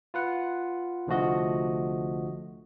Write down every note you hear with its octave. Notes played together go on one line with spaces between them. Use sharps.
F4 B4 F#5
C2 D3 F3 A3 F#4 D#5